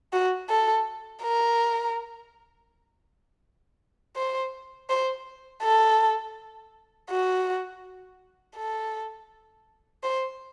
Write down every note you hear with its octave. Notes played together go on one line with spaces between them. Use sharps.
F#4
A4
A#4
C5
C5
A4
F#4
A4
C5